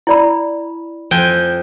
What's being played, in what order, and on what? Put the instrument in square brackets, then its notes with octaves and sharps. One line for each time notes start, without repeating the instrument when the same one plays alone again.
[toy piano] E4 D5 B5
[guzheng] F2 G5 G#5